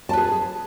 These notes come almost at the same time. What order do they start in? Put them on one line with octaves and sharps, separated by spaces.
A5 B4 G#4